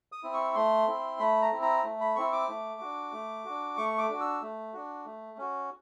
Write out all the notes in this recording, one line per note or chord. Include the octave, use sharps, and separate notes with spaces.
D#6
C4 E4
C#6
A3 C6
C4 E4
A3 B5
A#5
C4 E4
A#5
A3
B5
C4 E4 C#6
D6
A3
D4 F#4
A3
D4 F#4
A3 C#6
D6
D4 F#4
E6
A3
D4 F#4
A3
C#4 F#4